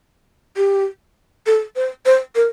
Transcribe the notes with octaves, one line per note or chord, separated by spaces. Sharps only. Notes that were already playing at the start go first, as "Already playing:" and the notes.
G4
A4
C5
C5
A#4